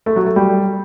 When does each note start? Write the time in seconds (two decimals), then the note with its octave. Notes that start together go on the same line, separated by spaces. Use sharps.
0.06 A3
0.16 F#3
0.26 A3
0.36 G3